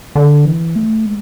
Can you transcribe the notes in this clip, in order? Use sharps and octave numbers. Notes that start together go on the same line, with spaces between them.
D3
E3
A3
G#3